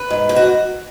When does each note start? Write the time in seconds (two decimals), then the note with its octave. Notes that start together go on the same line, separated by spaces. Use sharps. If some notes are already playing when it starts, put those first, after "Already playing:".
Already playing: B4
0.10 G#2
0.29 G#2
0.36 F#4